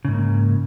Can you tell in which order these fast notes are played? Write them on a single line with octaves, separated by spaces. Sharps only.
C#3 G#2 A#3